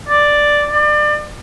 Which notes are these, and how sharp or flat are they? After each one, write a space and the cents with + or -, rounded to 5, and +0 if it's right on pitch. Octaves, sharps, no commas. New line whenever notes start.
D5 +0
D5 +30